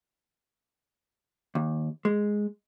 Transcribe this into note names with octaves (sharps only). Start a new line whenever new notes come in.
D#2
G#3